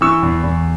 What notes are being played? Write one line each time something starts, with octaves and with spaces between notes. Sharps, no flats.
E3 C#6 E6
E2
E2